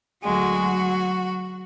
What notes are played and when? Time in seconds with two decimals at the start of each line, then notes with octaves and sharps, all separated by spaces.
0.22 D2 D3 F#3 G#3 F#4